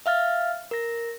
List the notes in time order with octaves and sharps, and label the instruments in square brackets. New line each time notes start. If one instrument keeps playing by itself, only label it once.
[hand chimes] E5 F5 F6 A6
A#4 A#6